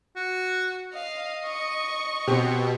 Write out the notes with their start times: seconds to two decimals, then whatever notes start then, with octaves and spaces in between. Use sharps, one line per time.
0.16 F#4
0.94 D#5 F5
1.46 C#6
2.27 B2 C4 G4